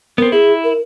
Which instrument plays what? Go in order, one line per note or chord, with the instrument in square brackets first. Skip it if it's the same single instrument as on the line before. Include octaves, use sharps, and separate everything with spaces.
[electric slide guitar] B3 C4 [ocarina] A#4
[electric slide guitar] E4 [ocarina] G#4
[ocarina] A#4